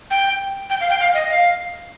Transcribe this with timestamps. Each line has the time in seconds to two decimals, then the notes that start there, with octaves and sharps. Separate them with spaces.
0.11 G5
0.70 G5
0.81 F5
0.90 G5
1.00 F5
1.14 D#5
1.30 F5